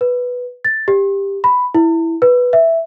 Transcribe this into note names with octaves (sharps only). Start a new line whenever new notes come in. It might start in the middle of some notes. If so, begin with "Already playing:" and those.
B4
A6
G4
B5
E4
B4
E5